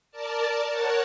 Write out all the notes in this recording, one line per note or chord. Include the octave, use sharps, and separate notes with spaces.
A#4 D5 A5
A#4 C#5 F#5 A5